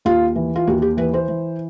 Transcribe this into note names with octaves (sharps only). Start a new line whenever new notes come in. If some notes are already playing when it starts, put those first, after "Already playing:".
D#2 F4
E3
F4
D#2 F#4
G4
E3 B4
C5
E3